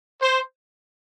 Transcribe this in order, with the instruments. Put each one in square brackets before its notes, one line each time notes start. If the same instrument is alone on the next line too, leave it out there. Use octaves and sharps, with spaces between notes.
[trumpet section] C5